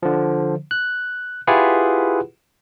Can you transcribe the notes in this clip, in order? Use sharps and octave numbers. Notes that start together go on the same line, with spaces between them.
D3 F3
F#6
E4 F4 G4 G#4 B4 F#5